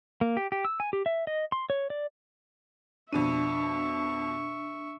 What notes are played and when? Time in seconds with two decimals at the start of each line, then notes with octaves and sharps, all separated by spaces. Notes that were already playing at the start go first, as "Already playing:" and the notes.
0.21 A#3
0.37 G4
0.52 G4
0.65 E6
0.80 G#5
0.93 G4
1.06 E5
1.27 D#5
1.52 C6
1.70 C#5
1.90 D5
3.13 F2 B2 D4 E5 C#6 D#7